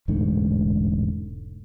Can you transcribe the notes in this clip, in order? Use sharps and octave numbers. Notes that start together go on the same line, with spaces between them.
E1 A1 G#2 D3